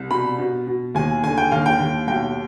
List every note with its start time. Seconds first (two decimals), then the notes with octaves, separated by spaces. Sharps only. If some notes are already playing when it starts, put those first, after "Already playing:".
Already playing: C2
0.10 B2 B5
0.39 B2
0.67 B2
0.95 D#2 G#5
1.24 D3 G#5
1.38 G5
1.51 D#2 F5
1.66 G5
1.80 D#2
2.07 B1 G5